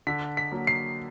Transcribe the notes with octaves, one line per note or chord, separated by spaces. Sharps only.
D3 B6
B6
F#3 A#3
C7